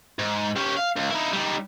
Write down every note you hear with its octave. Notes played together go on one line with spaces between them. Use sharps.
G#2
C#4 G4
F5
C#2
D#4 E4
G3 D#4